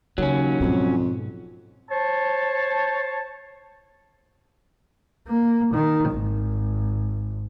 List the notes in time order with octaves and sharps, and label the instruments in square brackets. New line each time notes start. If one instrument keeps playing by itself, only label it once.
[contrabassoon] D#2 [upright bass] C#3 [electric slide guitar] F#3 C#4
[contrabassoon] F2 [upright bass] G#2 B2
[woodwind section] C5 C#5 A5
[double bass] A#3
D#3
G#1